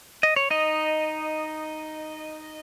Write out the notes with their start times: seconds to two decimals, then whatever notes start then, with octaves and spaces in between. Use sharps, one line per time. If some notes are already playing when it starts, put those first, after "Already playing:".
0.23 D#5
0.36 C#5
0.50 D#4 D#5